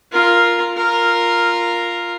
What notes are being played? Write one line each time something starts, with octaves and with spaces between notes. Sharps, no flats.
F4 A#4
F4 A#4